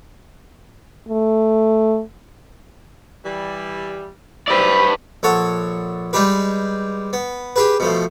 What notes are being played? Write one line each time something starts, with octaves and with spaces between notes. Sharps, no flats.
A3
E3 G3
G3 E4 B4 C5 D5
A#1 A4 C#5 F#5 A5
G3 G#3 D#4 G4 B4
B3
G4 G#4 B4
B2 F3 A3